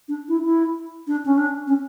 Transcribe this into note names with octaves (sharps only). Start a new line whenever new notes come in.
D4
E4
E4
D4
C#4
D4
C#4